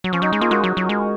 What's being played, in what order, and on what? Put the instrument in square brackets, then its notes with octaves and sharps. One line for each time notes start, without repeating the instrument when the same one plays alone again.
[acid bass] F#3
[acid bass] F3 [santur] C#4
[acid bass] F#3 [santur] D#4
[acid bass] G#3
[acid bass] A#3 [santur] F4 G#4
[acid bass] G#3 [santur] F#4 A#4
[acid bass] F#3
F#3
G#3